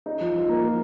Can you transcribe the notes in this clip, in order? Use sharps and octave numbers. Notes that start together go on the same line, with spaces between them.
D#4
F3
F3
A#3
F3